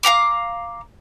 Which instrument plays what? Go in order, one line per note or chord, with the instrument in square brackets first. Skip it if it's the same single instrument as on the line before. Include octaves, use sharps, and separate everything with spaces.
[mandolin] F5 F#5 A#5 D6